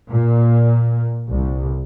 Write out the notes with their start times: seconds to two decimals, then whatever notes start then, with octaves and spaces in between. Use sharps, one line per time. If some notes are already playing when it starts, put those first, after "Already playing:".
0.11 A#2
1.30 C2